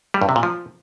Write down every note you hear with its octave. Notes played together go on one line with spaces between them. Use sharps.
G3
G2
C3
A#2
F3